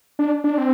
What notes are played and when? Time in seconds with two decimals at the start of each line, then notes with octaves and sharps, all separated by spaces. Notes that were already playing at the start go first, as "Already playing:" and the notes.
0.19 D4
0.44 D4
0.58 C4